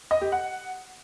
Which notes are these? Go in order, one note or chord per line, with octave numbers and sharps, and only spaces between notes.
D#5
G4
F#5